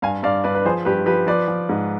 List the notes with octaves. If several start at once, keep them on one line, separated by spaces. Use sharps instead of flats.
G2 F5 G#5
G2 D5 F5
G2 B4 D5
B4
F3 G#4 C5
G2 G4 B4
F3 G4 B4
F3 B4 D5
F3
G#2